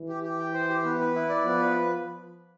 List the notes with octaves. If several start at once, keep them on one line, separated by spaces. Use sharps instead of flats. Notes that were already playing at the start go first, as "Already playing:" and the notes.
Already playing: E3
G4
G4
G5
C5
G4
B3
B4
E4
D5
F3 B3
B4